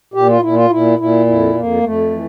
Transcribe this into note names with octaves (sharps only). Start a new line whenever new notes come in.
A#2 G4
F4
A#2 E4
F4
A#2 E4
A#2 E4
F2 E4
F2 A#3
F2 A3
E3